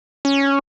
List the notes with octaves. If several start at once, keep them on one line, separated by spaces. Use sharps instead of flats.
C#4